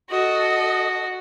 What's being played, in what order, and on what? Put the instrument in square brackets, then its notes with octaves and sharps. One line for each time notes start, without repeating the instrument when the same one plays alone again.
[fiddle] F#4 [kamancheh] A4 D#5